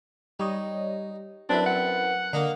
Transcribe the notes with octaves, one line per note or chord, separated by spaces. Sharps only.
G3 D#4 C#5 D#5
F#2 C4 D4 E4 B4
F#5
D3 A#3 D#5 A#5